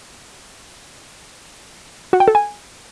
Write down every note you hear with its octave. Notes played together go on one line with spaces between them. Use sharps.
F#4
G5
A4
G#5